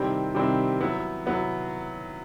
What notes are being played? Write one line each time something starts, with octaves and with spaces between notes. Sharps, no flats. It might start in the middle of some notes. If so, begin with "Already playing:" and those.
Already playing: C3 D#3 G3 C4 E4
C3 D#3 G3 C4 E4
F#3 B3 E4
F#3 B3 E4